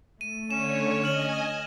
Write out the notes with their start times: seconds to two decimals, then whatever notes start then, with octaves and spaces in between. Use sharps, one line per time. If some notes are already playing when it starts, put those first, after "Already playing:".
0.21 A3 D#7
0.51 D3 C#4 C#5 E7
1.04 D#5 G#5 F6 F#7